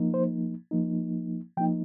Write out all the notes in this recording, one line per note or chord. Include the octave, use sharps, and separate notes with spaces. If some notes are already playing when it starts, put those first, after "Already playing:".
Already playing: F3 A#3 D#4
C5
F3 A#3 D#4
F3 A#3 D#4 G5